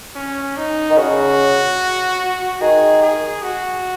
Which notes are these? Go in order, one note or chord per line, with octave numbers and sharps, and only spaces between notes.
C#4
D#4
D#3
C#3 F#4
D#3 G#4
G#4
F#4